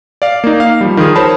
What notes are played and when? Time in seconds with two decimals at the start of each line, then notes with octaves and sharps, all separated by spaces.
0.22 D5 F5
0.44 A#3 D#4
0.60 F5
0.81 F3 G3
0.97 D#3 F3 F4 G#4 D#6
1.16 A#4 C5 C#5 A5 B5